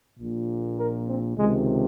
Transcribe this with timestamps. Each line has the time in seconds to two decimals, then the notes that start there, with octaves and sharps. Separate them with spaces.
0.18 A#1 A#2
0.78 A#4
1.07 C4
1.37 C#2 C3 D#3 G#3